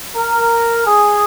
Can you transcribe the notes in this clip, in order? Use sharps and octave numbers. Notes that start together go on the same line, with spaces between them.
A#4
G#4